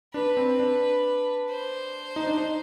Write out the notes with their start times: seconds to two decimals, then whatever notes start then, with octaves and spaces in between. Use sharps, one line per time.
0.14 D4 B4
0.37 C4
0.60 D4
1.49 C5
2.16 D#4
2.27 D4
2.38 D#4